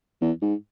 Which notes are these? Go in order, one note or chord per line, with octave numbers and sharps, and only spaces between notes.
E2
G#2